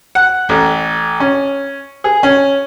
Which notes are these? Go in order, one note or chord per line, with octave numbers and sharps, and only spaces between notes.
F#5
A1
C#4
G#4
C#4